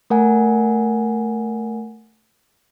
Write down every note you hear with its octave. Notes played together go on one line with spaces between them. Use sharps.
A3 A#4 F#5 G#5